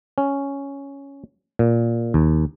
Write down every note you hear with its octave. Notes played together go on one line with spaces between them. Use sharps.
C#4
A#2
D#2